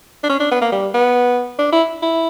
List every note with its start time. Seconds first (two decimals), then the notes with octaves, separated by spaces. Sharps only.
0.23 D4
0.29 C#4
0.40 D4
0.51 B3
0.61 A#3
0.72 G3
0.94 B3
1.59 D4
1.72 E4
2.02 E4